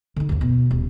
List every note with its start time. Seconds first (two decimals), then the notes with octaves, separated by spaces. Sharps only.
0.16 D3 D#4
0.29 F#1 D#2
0.41 B2
0.71 D#1